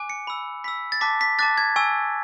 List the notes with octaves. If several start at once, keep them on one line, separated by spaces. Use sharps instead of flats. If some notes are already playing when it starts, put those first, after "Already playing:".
Already playing: G#5 D6 F#6
C#7
B5 E6
B5 E6 B6
A6
A5 D6 F#6 B6
B6
A5 D6 F#6 A6
G#6
G#5 C#6 E6